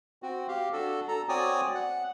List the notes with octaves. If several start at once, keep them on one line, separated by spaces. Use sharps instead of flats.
C4 F#4
G4 F5
D4 F#4 A4
A4 A#5
C4 F#4 C#5 D5 G#5 D#6
F#5